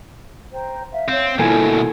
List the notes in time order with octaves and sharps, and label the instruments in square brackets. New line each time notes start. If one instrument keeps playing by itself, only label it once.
[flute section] C5 G5 A#5
E5 F5
[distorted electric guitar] C4 [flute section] C#5 F5
[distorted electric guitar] D2 B2 [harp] A#3 G#5 [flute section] E4 F4 A4